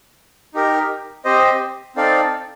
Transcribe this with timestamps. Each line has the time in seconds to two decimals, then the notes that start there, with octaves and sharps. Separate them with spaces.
0.54 D#4 G4 A#4
1.25 C4 G4 C5 D#5
1.96 C4 D#4 A4 D5 F5